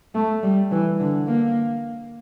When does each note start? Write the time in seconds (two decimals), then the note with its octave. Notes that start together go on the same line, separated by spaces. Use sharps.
0.15 A3
0.43 G3
0.72 E3
1.00 D3
1.28 A#3